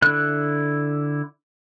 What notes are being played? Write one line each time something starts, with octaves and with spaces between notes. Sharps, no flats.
D3 E4 F#6